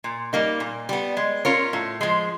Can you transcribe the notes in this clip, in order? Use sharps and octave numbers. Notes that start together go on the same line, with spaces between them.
A#2
G3 A#3 D#4
A#2
G3 B3
G#3
C#4 F4 A#4 C#5
A2
F3 G#3